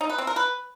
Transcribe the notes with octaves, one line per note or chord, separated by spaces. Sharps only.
D#4
B4
C4
A#4
B4